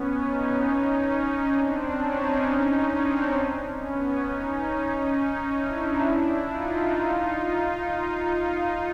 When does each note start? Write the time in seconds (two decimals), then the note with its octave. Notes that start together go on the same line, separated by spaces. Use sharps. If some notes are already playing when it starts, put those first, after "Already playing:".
Already playing: B3 C#4
0.18 C#4 D#4
1.08 C#4 D#4
1.53 C4 D4
1.98 C#4 D#4
2.42 C#4 D#4
2.88 C4 D4
3.78 B3 C#4
4.22 C#4 D#4
5.58 D4 E4
6.47 D#4 F4
7.82 D#4 F4